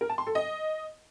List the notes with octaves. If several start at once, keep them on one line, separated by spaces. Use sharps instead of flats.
A#4
A5
C6
A4
D#5